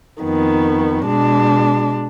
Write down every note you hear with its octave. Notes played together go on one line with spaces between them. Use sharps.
F2 D#3 B3
B2 G#3 D4